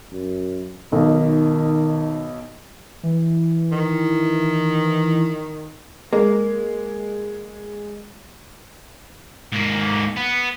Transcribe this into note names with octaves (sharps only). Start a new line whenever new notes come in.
F#2
B1 B2 D#3
E3
D#3
G#3 A#3
G#2 A#3
B3 B4